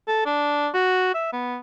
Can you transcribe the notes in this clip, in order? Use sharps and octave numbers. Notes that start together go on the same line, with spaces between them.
A4
D4
F#4
E5
B3